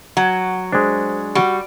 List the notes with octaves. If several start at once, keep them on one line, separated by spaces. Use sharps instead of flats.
F#3 F#5
G#3 D4 C5
G3 F#4 F#5 B5 C#6